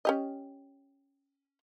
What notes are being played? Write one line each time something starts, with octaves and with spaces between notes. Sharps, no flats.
C#4 G4 D#5